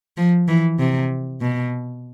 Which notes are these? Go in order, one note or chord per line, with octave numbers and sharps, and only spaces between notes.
F3
E3
C3
B2